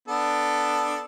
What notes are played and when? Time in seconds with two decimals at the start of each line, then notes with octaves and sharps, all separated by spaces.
0.08 B3 D4 A4